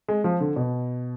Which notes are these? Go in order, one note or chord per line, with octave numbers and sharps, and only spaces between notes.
G#3
F3
D3
B2